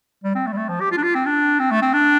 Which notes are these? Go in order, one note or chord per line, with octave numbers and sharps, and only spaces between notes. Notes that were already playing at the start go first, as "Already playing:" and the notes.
G3
C4
A3
G3
A3
F3
G4
F4
D4
F4
C4
D4
C4
A3
C4
D4